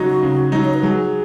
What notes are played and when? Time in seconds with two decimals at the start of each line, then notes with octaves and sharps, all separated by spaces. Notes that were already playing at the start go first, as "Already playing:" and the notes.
Already playing: C#3 F#3 D#4 F#4
0.23 C#3
0.52 F#3 D#4
0.64 C#5
0.74 B4
0.83 F#3 G#4